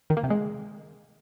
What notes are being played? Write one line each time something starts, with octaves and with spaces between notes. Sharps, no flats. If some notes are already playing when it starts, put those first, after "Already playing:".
D#3
A#3
C3
G#3